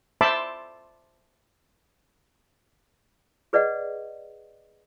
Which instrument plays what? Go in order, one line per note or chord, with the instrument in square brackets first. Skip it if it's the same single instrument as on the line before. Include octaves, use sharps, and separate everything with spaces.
[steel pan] C5 E5 A5 B5 C6 D6
[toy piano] G#4 B4 D5 D#5 F#5